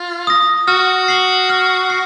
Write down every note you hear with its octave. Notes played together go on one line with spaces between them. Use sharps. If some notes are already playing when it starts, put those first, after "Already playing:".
Already playing: F4
D#6 A#6
F#4 F6
C7 F#7
F6
C7